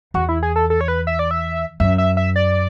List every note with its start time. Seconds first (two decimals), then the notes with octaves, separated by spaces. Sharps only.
0.14 E2 F#4
0.29 E4
0.43 G#4
0.56 A4
0.70 A4
0.81 C#5
0.88 B4
1.07 E5
1.19 D5
1.31 E5
1.80 F#2 E5
1.98 E5
2.17 E5
2.36 D5